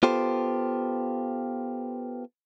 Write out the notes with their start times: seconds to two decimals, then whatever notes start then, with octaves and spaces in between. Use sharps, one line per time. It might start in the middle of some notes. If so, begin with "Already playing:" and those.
0.03 B3 F4 G4 A4 C5